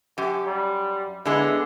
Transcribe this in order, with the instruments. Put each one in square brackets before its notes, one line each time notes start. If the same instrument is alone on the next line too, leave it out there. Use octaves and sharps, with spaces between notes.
[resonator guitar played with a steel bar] F#2 [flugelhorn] G4
[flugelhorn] G3
[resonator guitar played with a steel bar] D3 G#3 B3 [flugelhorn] E4